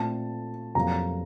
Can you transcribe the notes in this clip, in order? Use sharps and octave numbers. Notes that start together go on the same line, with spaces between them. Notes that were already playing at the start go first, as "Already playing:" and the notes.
Already playing: A#2 A3 C4 A5
F2 C3 F#3 A#3 A#5